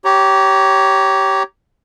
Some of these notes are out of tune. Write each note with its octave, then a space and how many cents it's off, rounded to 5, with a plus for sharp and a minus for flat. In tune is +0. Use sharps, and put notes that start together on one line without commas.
G4 -20 C#5 +0 A#5 +0